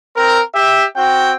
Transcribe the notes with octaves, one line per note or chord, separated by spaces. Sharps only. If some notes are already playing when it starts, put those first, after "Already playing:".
C4 A#4
G4 E5
C4 F#4 G5